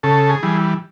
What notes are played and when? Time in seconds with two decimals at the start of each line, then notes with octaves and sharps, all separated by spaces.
0.03 C#3 A4
0.30 G#4
0.43 E3 G3